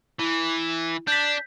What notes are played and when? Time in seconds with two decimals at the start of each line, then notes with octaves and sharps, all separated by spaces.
0.19 E3 E4
1.08 D4 G6 B6